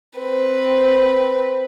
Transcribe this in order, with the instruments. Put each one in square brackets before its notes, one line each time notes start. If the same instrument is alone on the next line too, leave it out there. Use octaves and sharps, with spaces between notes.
[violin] C4 B4